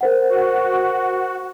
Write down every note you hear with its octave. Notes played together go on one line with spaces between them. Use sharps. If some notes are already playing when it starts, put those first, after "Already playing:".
A#4 C5 F#5
F#4